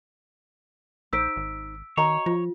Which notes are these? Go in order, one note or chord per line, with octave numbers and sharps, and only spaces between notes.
A#1 D#4 C5 E6 B6 D7
G#1
D#3 F#4 C#5 D#5 A#5
F3 F4